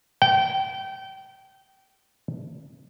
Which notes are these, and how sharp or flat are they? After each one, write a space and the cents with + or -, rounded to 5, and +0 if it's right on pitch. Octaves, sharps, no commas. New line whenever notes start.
G5 -25